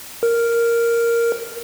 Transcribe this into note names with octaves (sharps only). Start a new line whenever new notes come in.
A#4